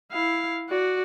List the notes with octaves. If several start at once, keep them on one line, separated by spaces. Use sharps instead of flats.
E4 F5
F#4 D5